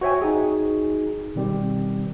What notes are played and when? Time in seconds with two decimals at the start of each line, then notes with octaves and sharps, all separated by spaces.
0.01 F#4 C5 C#5 E5 G5 G#5
0.22 D#4 F#4 G#4
1.35 B2 D#3 G3 C4 G4